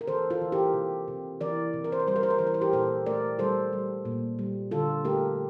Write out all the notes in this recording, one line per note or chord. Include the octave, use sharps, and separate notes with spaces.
A#4
E3 A4 C5
F4 A4
E3
G4 A#4
C3
C3
E3 A#4 D5
C3
A#4
C5
A#4
G3 C5
A#4
C5
A#4
E3 C5
A#4
C5
G4 A#4
A#2 A4 C5
A3 A#4 D5
G3 A4 C5
G3
A#2
G3
D3 F4 A4
A3 G4 A#4